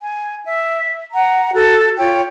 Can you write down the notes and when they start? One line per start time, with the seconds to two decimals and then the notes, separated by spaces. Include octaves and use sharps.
0.02 G#5
0.44 E5
1.12 F#5 A#5
1.53 F#4 A4
1.97 F4 C#5 G5